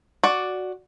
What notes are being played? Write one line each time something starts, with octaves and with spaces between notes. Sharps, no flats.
F#4 D5